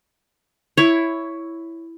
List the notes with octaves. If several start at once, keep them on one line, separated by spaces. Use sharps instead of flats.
E4 C#5